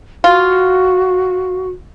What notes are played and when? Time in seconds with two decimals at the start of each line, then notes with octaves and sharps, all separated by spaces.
0.24 F4 F#4